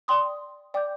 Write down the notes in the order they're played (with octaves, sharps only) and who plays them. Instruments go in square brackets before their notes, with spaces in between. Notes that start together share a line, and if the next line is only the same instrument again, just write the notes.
[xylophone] D5 G5 C6 D#6
D5 G5 D6 G6